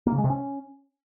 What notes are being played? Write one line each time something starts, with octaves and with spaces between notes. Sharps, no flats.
A#3
C#3
G#3
C3
C#4